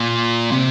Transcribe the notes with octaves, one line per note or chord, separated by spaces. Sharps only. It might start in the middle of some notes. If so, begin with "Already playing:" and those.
Already playing: A#2
C3